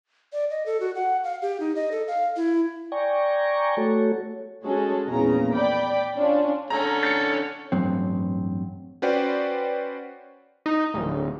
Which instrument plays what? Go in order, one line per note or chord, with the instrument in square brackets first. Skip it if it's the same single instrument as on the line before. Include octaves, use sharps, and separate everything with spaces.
[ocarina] D5
D#5
A4
F#4
F#5
F5
G4
D#4
D#5
A4
F5
E4
[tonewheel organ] D5 G5 G#5 A#5 C#6
A3 F#4 A4 C#5
[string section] G#3 C#4 F#4 G#4 A4 C#5
A#1 E2 A#2 C#3 A#5
D5 G5 B5 D6
C#4 D4 F4
[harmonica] D3 C#4 A4 [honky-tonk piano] A#5
[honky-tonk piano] A6 C#7
[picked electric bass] A1 G2 F#3 C4
[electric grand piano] C#4 F#4 B4 C5 D5 G5
[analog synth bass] D#4
D1